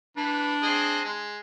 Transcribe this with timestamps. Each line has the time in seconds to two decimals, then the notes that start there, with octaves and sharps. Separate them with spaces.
0.17 E3 D4 B4
0.63 C4 G#4 D#5
1.04 G#3